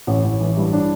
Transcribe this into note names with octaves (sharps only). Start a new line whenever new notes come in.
A1
A1
E3
G2
D4